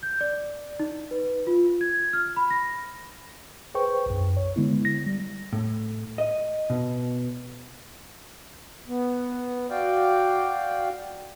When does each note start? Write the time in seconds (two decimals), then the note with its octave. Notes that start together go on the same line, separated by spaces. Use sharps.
0.03 G6
0.21 D5
0.80 D#4
1.11 B4
1.47 F4
1.81 G#6
2.13 F6
2.36 B5
2.50 A#6
3.75 G#4 B4 C5 G5 C#6
4.06 B1 F#2
4.37 C#5
4.56 D3 G#3 B3 E4
4.85 A#6
5.06 G3
5.53 A2
6.18 D#5
6.70 B2
8.88 B3
9.70 F#4 D5 F5 G5